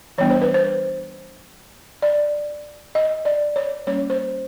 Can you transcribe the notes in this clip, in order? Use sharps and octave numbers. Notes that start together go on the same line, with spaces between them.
E3 G3 B3 D4 C#5
C5
B4
C5
D5
D#5
D5
C#5
G3 A#3 C#4 C#5
C5